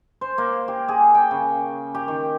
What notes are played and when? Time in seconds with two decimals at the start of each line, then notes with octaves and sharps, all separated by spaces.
0.21 C5
0.38 A#3
0.68 G4
0.88 G#4
1.15 G5
1.31 C#3
1.95 G4
2.08 D#3